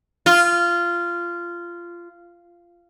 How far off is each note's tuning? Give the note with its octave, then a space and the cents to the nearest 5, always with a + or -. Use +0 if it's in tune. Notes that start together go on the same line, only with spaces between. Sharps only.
F4 -15